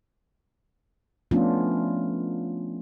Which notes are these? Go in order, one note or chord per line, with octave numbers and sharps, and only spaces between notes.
F3 A3 B3 C#4 D4 F4